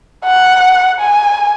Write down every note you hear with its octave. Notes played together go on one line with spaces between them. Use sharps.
F#5
G#5